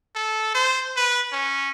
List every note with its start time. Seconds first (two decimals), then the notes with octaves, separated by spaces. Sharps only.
0.15 A4
0.55 C5
0.97 B4
1.32 C#4